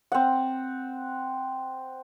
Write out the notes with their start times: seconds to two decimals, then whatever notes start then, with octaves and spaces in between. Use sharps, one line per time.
0.12 C4 F#5